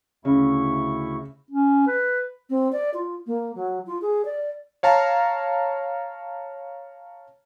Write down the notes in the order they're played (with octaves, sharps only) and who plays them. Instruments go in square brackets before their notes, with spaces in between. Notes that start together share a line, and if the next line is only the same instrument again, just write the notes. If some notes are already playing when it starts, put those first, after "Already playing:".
[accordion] D2 E4 C#6 [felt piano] C#3
[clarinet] C#4
B4
[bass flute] C4
D5
F4
A#3
F#3
F4
G#4
D5
[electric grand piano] C#5 F5 A5 A#5